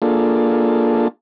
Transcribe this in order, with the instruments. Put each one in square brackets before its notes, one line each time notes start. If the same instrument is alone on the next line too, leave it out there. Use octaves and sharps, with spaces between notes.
[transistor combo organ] A#3 D4 F4 G#4 A4